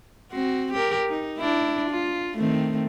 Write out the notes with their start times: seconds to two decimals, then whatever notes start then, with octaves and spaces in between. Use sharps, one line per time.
0.32 C4 F#4
0.73 G4 A#4
1.09 D#4
1.38 D4 E4
1.90 F4
2.37 D#3 A3 C4